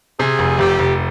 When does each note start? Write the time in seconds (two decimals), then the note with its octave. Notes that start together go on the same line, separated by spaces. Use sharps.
0.19 C3 G#4
0.39 F1
0.59 F1 G4
0.79 F1